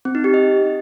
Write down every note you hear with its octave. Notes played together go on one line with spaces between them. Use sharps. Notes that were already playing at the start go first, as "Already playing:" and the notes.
C4
D#4
G4
D#5